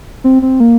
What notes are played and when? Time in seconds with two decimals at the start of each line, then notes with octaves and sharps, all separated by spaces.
0.24 C4
0.42 C4
0.60 A#3